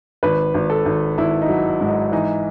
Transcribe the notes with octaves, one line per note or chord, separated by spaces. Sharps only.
G#1 B4
G#1
A4
G#1
G#1 E4
D#4
F#3
G#2
D#4
E3 D#4